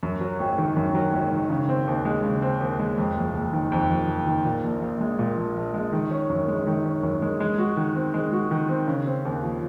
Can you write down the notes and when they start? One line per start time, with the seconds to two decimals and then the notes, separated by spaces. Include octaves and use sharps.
0.03 F#2
0.21 F#3
0.40 G#1
0.58 D#3
0.76 F#2
0.95 F#3
1.13 G#1
1.32 D#3
1.50 C#3
1.69 C4
1.87 D#2
2.05 G#3
2.24 C#3
2.42 C4
2.61 D#2
2.79 G#3
2.98 F2
3.16 F#1
3.34 F#1
3.53 D#3
3.72 F2
3.90 F#1
4.08 F#1
4.27 D#3
4.45 A#2
4.64 A#1
4.82 A#1
5.01 G#3
5.19 A#2
5.37 A#1
5.56 A#1
5.74 G#3
5.92 D#3
6.11 C#4
6.30 F#2
6.48 G#3
6.67 D#3
6.85 C#4
7.03 F#2
7.22 G#3
7.40 G#3
7.59 F#4
7.77 D#3
7.96 C4
8.14 G#3
8.32 F#4
8.51 D#3
8.69 C4
8.88 C#3
9.06 C4
9.25 D#2
9.43 F3